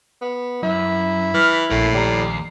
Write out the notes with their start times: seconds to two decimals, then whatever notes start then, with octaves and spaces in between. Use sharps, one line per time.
0.21 B3
0.63 F#2 E4
1.34 E3 F6 B6
1.70 A#1 A2 A#4 E5 C7
1.94 D#2 G3 A#5